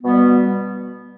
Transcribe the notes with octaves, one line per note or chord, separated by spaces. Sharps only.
B2 G3 B3